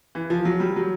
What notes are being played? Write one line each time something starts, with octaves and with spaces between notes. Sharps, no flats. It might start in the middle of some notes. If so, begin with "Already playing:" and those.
E3
F3
F#3
G3
F#3